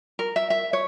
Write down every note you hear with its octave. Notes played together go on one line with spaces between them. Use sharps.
A#4
E5
E5
C#5